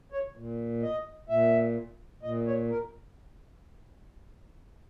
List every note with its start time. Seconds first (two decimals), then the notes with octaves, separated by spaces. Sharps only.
0.12 C#5
0.36 A#2
0.82 D#5
1.29 A#2 E5
2.23 A#2 D#5
2.47 C#5
2.70 A#4